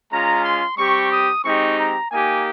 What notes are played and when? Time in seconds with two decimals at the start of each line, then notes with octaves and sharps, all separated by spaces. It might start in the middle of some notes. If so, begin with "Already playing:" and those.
0.11 G#3 C#4 F4 A#5
0.44 C6
0.77 G3 C4 G4 C#6
1.11 D#6
1.44 G#3 C4 D#4 G4 C#6
1.78 A#5
2.11 A#3 D#4 G4 G#5